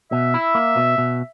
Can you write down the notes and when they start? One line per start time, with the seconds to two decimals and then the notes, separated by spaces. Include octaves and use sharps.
0.12 B2 E5
0.34 E4
0.55 A#3
0.76 B2
0.98 B2